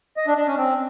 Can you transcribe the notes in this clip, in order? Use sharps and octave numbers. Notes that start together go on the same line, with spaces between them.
D#5
D4
D4
C#4
C4